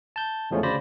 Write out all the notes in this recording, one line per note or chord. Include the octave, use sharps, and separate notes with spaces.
A5 G6
E2 A2 F3 G#3 A3 C#4
D2 C#3 C5 D5 B5 A#6